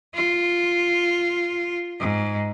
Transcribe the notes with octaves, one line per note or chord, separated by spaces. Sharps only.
F4
G#2